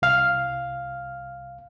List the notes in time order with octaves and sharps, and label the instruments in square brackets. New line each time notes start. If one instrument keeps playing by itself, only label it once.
[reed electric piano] C2 F5 F6